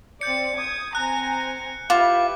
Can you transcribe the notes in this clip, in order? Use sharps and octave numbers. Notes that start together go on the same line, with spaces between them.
C4 D5 G6 C#7
D#6 G#6
C4 G#5 A#5 F#6
E4 F4 G4 B4 D6